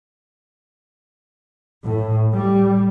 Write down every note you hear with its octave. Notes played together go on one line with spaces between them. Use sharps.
A2
G3